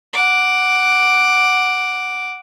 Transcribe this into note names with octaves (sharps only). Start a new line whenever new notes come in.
F#5 D6